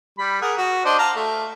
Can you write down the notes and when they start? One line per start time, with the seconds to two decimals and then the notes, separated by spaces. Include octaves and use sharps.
0.19 G3 B5
0.42 G#4 A#4 F#5
0.57 F#4
0.85 D4 C5 D#5
0.99 F5 A5 A#5
1.16 A3